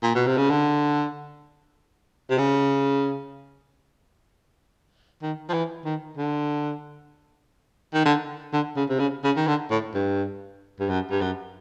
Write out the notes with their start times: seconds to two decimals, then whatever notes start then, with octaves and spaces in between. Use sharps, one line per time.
0.03 A#2
0.15 B2
0.27 C3
0.38 C#3
0.50 D3
2.30 C3
2.38 C#3
5.22 D#3
5.49 F3
5.54 E3
5.85 D#3
6.17 D3
7.94 D#3
8.06 D3
8.53 D3
8.76 C#3
8.89 C3
9.00 C#3
9.24 C#3
9.36 D#3
9.47 D3
9.71 A2
9.94 G2
10.80 G2
10.89 F#2
11.11 G2
11.21 F#2